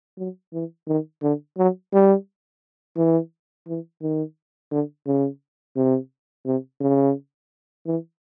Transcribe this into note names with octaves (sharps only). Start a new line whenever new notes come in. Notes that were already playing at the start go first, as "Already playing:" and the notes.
F#3
E3
D#3
D3
F#3
G3
E3
E3
D#3
D3
C#3
C3
C3
C#3
E3